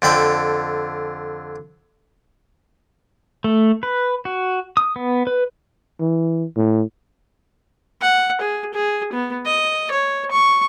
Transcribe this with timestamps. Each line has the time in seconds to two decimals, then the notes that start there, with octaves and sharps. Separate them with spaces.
0.02 F2 D3 G5 B5
3.44 A3
3.83 B4
4.25 F#4
4.77 D#6
4.96 B3
5.27 B4
6.00 E3
6.56 A2
8.02 F#5
8.41 G#4
8.74 G#4
9.13 B3
9.46 D#5
9.91 C#5
10.31 C#6